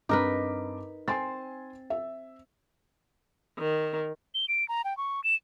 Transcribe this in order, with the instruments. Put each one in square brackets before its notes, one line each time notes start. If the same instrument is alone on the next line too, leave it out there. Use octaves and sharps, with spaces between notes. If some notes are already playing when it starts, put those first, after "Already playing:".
[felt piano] G2 C4 D6 [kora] D#4 A#4 B4
[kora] C4 [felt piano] G#5 C6 A6
[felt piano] E5
[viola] D#3
[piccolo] G7
D7
A#5
G5
C#6
E7